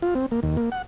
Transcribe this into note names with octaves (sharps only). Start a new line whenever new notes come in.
F4
C4
A#3
D#2
A#3
F#5